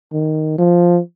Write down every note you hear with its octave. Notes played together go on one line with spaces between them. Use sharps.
D#3
F3